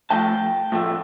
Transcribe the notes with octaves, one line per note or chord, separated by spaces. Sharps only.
A2 F3 A3 G5 A5
A2 F3 A3